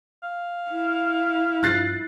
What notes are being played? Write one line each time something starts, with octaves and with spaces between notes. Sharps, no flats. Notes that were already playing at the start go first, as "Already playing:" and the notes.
F5
E4
G2 F3 F#6 A6 C7